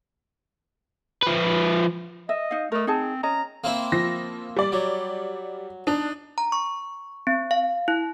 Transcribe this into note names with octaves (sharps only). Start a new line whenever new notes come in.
F3 B4
D#5 E5
D#4 F5
A3 A#4 D#5
C4 D#4 G#4 A5
C#4 D#5 A#5
A#3 C4 E4
F3 A#6
G3 D5
F#3
D4 D#4
A#5
C#6
C4
F5
E4